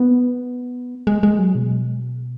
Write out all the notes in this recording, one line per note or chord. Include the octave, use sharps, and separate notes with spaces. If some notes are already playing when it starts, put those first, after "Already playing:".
Already playing: B3
G#3
G#3
F#3
B2